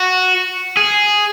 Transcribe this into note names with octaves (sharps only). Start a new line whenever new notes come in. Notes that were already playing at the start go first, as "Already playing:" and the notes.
Already playing: F#4
G#4